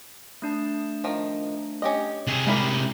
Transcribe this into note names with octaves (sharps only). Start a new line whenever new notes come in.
A3 D4 A5
D#3 F3
C#4 G4 D#5
C3 G#4
G3 G#3 E4 A#4